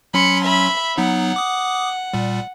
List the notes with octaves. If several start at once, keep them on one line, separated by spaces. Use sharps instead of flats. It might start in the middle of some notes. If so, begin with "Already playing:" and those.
F#3 C#4 B5 C6 C#7
E5 B5
F#3 B3 D#4 F#5
D6 D#6
A#2 G3